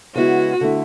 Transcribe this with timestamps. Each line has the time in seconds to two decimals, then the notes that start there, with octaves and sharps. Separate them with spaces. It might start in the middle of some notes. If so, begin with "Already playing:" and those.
0.15 C#3 G#3 B3 E4 F#4
0.61 D3 A3 E4